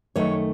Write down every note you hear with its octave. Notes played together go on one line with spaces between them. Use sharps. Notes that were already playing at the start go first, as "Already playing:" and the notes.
F#2 D#3 A3 C#5